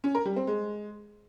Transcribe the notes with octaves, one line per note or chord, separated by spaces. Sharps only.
C#4
A#4
G3
C4
G#3